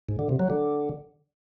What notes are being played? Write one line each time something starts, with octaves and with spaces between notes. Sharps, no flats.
G#2
D3
C3
F#3
D3